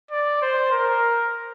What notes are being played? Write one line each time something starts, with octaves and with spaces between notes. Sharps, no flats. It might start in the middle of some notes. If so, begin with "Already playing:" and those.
D5
C5
A#4